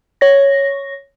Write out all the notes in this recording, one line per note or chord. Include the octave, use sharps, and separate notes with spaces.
C#5 A#6